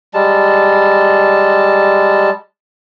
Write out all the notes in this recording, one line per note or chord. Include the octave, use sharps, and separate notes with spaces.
G3 G#3 A5